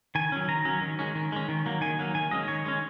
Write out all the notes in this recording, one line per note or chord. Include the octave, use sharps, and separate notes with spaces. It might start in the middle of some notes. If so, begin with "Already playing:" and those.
D#3 G#5
F#3 C#4
D#3 A#5
F#3 C#4
D#3
G#3 C#4
D#3
G#3 C#4
D#3
F#3 A#3
D#3 G#5
F#3 A#3
D#3 G#5
G#3 C#4 D#5
D#3 C#5
G#3 C#4